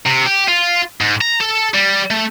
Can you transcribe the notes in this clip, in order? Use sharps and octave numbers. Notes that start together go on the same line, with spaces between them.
C3
G4
F4
G#2
A#5
A4
G3
A3